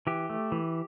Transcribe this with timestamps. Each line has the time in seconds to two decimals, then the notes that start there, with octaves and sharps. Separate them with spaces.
0.07 E3 G4
0.30 A3
0.52 E3